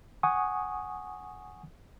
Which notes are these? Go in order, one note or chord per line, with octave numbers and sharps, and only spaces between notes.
F#5 G#5 C#6 D#6